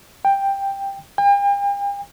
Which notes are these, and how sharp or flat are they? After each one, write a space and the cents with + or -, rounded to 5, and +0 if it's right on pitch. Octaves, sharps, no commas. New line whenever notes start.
G5 +10
G5 +45